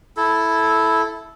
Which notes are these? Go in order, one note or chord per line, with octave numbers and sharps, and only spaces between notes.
E4 A4